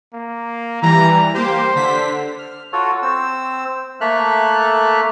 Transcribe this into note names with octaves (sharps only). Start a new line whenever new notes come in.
A#3
E3 G3 A#5
A#3 G4 C5
D3 B6
F6
F4 F#4 A4 C#5
C4 E6
A3 A#3 A4 E5 F6 F#6